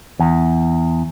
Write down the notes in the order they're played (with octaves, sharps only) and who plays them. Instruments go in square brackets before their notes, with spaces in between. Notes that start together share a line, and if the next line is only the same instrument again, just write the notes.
[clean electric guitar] E2